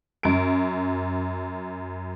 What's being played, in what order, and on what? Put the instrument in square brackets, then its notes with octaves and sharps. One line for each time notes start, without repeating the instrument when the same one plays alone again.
[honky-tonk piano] F#2 D7